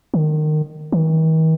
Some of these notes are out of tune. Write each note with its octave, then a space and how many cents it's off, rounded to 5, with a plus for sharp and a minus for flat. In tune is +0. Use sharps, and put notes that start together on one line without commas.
D#3 -25
D#3 +45